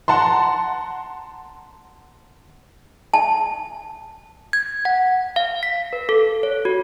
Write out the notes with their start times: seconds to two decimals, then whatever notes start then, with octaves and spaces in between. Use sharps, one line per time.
0.08 F#5 A5 A#5 C6
3.14 A5
4.53 G#6
4.85 F#5
5.36 F5
5.63 B6
5.93 B4
6.09 A4
6.43 C#5
6.65 F#4